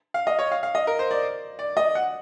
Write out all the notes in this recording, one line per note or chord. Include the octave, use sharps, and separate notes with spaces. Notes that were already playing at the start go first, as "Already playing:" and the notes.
F5
D#5
C#5
F5
F5
D#5
A#4
C5
D5
D5
D#5
F#5